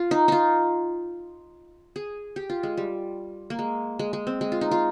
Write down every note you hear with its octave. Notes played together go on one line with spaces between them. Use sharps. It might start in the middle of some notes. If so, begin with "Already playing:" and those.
Already playing: F4
D#4
D#4 F4
G#4
G4
F4
G#3
G3
A#3
G#3
G#3
G#3
C4
G#3
F4
D#4
F4